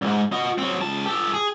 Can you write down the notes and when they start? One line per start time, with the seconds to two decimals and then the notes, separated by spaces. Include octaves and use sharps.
0.02 C2 G#2
0.32 F#4 D#5
0.58 F#3 C4
0.81 C#2 A5
1.05 G4 A4
1.34 G#4